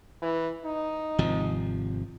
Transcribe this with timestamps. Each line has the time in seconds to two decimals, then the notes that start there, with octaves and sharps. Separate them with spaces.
0.22 E3
0.65 D#4
1.19 G#1 C3 F3